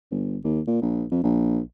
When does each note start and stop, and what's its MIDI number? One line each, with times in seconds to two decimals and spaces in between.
0.11 0.38 31
0.44 0.60 39
0.67 0.80 46
0.82 1.05 34
1.11 1.21 41
1.23 1.60 34